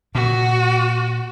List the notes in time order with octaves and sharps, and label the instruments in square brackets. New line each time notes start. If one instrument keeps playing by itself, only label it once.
[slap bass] A#2 [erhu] F#4